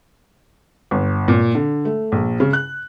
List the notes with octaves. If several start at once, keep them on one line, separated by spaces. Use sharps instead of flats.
G1
A#2
D3
A3
A#1
C#3
F#6